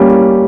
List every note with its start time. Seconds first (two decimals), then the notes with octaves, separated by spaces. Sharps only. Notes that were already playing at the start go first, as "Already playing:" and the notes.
Already playing: G3 A#3 C#4